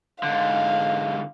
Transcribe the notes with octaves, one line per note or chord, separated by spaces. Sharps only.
G#2 D3 F5